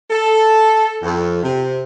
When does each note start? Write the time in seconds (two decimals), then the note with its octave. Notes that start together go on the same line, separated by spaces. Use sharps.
0.10 A4
1.03 F2
1.43 C3